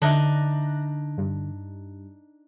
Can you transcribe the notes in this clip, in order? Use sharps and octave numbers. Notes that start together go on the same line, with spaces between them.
D3 D4 D#4 E5 F#6 A#6
G2